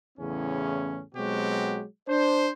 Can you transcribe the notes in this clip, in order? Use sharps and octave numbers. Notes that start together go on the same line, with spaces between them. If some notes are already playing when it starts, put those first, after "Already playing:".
E2 A2 C#3 C#4
B2 F#3 G#3 C4 F#4 G4
D4 C5